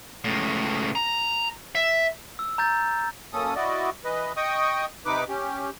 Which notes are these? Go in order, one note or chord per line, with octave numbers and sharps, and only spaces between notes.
C#2 A2
A#5
E5
E6
A#5 G6 A6
F#2 A#3 C#4 A4 D#6
E4 F#4 D5 D#5
E3 B4 D#5
D#5 G5 C#6 D#6
C3 D#4 B4 D6
C#4 G4